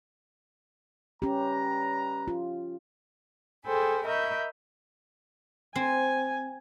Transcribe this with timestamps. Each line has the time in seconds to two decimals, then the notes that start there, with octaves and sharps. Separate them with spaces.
1.22 G3 C#4 G4 B4 A#5
2.28 F4
3.64 G#4 A4 C5 G5 G#5 B5
4.06 A#4 D#5 E5 B5 C#6 G6
5.76 C4 G#5